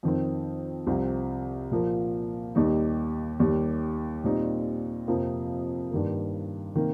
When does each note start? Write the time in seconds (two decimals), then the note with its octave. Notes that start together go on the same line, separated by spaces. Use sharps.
0.03 F2 D#3 C4
0.87 C2 C3 F3 C4
1.71 A#2 F3 A#3
2.55 D#2 D#3 G3 D#4
3.40 D#2 D#3 G3
4.24 A#2 G3 C4 D#4
5.08 F2 C3 F3 A#3
5.91 G2 D#3 A#3
6.75 C3 D#3 A#3